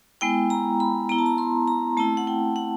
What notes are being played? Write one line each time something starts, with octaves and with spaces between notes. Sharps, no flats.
G#3 B3 E4 G5
A#5
B5
B3 E4 A#5
A5
A#5
C6
A#5
A3 C4 E4 A5
F#5
G5
F#5